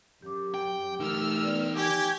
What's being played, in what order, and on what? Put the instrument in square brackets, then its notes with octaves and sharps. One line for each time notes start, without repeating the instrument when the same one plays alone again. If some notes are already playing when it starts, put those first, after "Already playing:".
[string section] F#2 [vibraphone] G4 D6
[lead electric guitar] G5
[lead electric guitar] E3 D#4 [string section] A3 E6 F6
[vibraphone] B3 B4 D5
[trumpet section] G4 [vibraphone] G#5 C#6 [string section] G#6